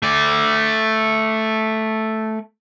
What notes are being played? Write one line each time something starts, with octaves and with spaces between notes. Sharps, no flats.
A3 D5